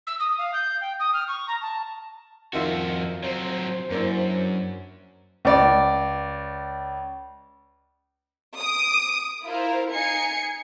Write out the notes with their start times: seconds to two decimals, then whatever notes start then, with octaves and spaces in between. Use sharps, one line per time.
0.07 E6
0.20 D#6
0.38 F5
0.53 G6
0.81 G5
1.00 D#6
1.13 F6
1.28 C#6
1.48 A#5
1.61 A5
2.53 F2 D#3 F4 F#4 E5
3.24 F#3 C4 C5
3.90 F#2 A#3 D4 E4
5.45 C#2 D5
8.59 D#6 D7
9.46 E4 F4 A#4 C5 F5
9.92 D#4 G#5 G#6 C7 C#7